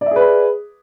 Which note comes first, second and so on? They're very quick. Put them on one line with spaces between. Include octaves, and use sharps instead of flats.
D5 E5 G#4 B4 B5